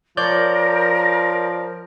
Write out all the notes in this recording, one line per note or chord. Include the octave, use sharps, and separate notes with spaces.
F3 A#4 C#5 D5 G6